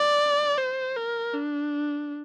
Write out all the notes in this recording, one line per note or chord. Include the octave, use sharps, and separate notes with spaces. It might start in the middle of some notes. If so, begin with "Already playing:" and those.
Already playing: D5
C5
A#4
D4